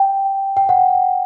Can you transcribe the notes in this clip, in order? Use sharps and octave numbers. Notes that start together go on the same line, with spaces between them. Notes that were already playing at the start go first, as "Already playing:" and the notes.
Already playing: G5
G5
F#5